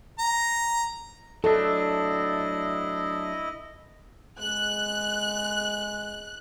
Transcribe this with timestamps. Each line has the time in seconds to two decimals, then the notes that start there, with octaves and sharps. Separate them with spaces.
0.19 A#5
1.44 F#3 A3 D4 E4 A4 D#5
4.39 G#3 F#6